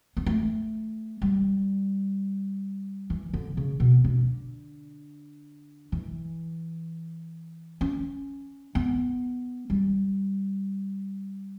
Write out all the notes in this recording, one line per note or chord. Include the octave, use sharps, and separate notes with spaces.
B3
A3
G3
E3
D3
C#3
B2
D3
E3
C#4
B3
G3